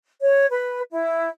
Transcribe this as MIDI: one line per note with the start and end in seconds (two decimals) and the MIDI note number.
0.22 0.46 73
0.50 0.80 71
0.90 1.29 64